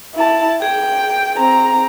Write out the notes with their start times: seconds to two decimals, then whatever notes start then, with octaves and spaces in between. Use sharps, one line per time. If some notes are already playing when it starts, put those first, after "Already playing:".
0.15 E4 A5
0.62 G#4 G5
1.39 C4 A#5